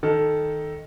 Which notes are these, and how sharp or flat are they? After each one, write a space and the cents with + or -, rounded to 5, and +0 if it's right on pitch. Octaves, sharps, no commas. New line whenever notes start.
D#3 +0 A4 +0